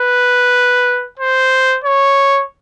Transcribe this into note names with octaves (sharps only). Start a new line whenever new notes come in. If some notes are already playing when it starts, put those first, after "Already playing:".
Already playing: B4
C5
C#5